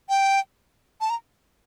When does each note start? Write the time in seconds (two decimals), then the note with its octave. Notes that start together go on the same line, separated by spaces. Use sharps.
0.09 G5
1.01 A5
1.10 A#5